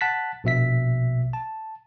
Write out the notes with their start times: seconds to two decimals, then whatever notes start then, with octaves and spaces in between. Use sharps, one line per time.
0.01 F#5 A5 F#6 A6 B6
0.44 A#1 B2 E5 B6
1.33 A5